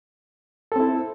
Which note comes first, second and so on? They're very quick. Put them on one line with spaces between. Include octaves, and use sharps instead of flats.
A4 C4 E4